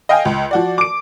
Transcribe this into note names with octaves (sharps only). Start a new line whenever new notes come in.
D#5 F5 G5 G#5
C#2
F3 F#4 D5
D6 D7